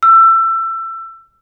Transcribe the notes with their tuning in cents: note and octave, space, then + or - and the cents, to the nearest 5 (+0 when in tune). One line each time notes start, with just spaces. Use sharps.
E6 +25